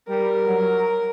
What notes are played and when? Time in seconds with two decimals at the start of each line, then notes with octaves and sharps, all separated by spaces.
0.08 G3 A#4
0.46 F#3